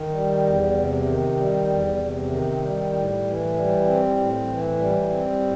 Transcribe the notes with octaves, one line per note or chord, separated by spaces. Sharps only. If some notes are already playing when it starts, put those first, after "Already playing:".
Already playing: D#3
G3
E2
C3
D#3
G3
E2
C3
D#3
G3
A2
E3
G3
C4
A2
E3
G3
C4
A2